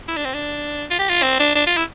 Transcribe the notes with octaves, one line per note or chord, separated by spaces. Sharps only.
E4
D4
C4
D4
F4
G4
F4
C4
D4
D4
F4
E4